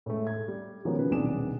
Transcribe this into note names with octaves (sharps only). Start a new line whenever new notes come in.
A2 G#3 A3
G#6
G3
D#3 F3 F#3 G#3 B3 C#4
C#3 F3 B4
D#1 B1 C3 D4 G#4 E7